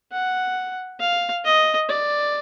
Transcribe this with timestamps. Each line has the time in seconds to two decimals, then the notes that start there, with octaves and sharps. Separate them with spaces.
0.12 F#5
1.00 F5
1.45 D#5
1.89 D5